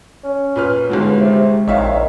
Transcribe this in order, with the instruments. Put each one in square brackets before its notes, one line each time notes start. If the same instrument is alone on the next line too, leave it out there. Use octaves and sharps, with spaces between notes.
[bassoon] C#4
[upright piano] A#2 B4 F6
[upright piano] G1 D#2 A#2 [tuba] G#3 [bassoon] B3
[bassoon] C3
[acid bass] A#1 [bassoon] D#3 [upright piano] C#5 E5 F5